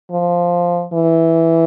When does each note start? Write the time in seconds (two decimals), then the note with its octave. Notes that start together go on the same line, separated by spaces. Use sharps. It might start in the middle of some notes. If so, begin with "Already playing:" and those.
0.11 F3
0.93 E3